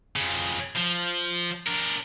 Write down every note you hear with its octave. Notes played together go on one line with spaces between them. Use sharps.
F2 C#3
F3
D4 A#4